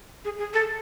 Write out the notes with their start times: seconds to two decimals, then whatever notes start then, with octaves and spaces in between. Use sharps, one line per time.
0.25 G#4
0.39 G#4
0.53 A4